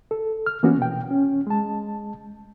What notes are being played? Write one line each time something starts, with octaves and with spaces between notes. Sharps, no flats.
A4
F6
E3 A#3 B3 C#4 F#4
B2 G5
C#4
G#3 A5